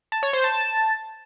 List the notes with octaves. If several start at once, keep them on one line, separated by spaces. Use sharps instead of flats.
A5
C#5
C5
A5